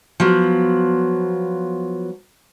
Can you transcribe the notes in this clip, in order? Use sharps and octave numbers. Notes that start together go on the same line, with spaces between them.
F3 F#3 B3